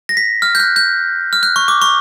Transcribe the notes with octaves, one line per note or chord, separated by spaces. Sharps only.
A#6
B6
F6
G6
F#6
G6
F6
F#6
C#6
D6
C#6